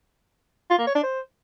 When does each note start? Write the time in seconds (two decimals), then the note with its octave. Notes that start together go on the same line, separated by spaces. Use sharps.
0.70 F4
0.78 A#3
0.87 C#5
0.95 D4
1.03 C5